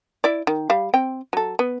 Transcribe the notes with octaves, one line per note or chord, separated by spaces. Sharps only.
E4 D5
D#3
G3 F5
C4 G5
F#3 A4
B3